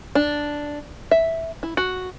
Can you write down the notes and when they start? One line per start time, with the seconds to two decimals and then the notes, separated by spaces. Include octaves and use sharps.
0.15 D4
1.11 E5
1.63 E4
1.77 F#4